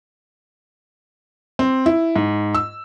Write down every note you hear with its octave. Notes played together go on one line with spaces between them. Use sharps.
C4
E4
G#2
E6